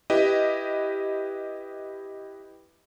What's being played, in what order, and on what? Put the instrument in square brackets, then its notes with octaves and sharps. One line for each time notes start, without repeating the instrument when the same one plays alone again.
[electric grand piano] E4 G4 B4 D#5